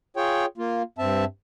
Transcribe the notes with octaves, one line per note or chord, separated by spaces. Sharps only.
F4 G#4 C#5 G5
A#3 F4
G2 C4 E5 A5